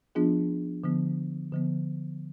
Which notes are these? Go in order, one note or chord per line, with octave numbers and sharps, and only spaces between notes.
F3 B3 D4 F4 G#4
D3 F3 B3
D3 F3 B3